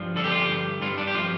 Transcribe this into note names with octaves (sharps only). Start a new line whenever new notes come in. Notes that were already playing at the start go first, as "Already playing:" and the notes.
Already playing: G2 F3
D3 A4
G4
F4
G4
G2
G2 F4
D4
G4
F3 F4